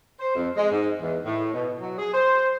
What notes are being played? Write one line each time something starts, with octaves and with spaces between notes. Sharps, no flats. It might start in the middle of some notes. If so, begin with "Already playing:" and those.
C5
F2
G#3
G#2
E2
A2
B2
F#3
G#4
C5